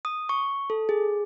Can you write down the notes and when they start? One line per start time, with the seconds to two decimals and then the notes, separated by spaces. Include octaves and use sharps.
0.05 D#6
0.29 C#6
0.70 A4
0.89 G#4